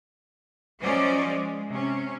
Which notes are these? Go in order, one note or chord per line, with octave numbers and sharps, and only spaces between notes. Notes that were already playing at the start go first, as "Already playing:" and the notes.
F3 F#3 C#4 C5 D5 D#5
G#3
C3 C#4